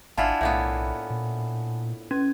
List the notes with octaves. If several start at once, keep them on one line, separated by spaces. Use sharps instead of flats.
G#1 D4 E4 F4 F#5 G#5 A5
B1 A2 A#3 B3
A#2
C#4 G#6